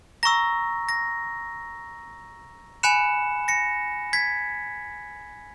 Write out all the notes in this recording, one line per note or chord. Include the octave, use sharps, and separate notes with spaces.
A#5 C#6 E6 A#6
A#6
G#5 B5 F#6 C#7 E7
A#6 C#7
G#6 B6